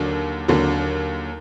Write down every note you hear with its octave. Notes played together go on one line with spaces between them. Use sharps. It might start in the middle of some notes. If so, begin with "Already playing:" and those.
Already playing: D#2 D3 F#3
D#2 D3 F#3